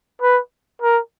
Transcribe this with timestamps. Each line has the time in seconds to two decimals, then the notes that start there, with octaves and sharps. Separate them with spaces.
0.21 B4
0.81 A#4